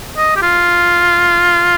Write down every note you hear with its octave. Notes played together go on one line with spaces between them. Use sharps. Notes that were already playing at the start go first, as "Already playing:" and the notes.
D#5
G4
F4